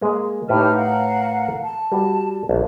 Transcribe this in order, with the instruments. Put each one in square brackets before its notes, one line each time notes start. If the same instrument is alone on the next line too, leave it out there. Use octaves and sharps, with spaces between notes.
[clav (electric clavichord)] G#3 A#3
[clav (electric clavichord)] A2 B4 A5 [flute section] D#4 G4 F6
[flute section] A#4 F5 F#5
A5
[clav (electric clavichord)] G3 F#4
A#1